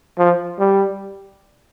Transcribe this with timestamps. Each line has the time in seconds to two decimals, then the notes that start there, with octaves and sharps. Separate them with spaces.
0.18 F3
0.59 G3